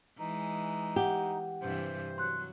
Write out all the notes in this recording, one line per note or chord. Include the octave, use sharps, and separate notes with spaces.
E3 G#3 D#4
G4 F#5
G2 C3 E3 C5
F#3 C6 F#6